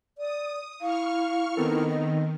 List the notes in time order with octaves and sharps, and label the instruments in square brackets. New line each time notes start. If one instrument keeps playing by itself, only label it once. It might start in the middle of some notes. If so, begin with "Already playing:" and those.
[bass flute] D5 [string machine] D#6
[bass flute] E4 [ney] F5 [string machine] C#6 F6
[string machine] D#3 [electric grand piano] B3 C4 A4 [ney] A#4
[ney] D#5